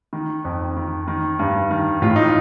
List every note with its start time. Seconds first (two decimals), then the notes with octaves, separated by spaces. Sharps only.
0.13 D#3
0.45 F2
0.76 D#3
1.08 D#3
1.39 G2
1.71 D#3
2.02 A2 F4
2.16 D#4